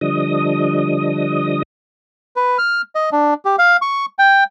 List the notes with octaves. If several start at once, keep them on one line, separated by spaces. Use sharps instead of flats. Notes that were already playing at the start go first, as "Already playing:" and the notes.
D3 F3 G3 D4 D#5 D#6
B4
F6
D#5
D4
G4
F5
C#6
G5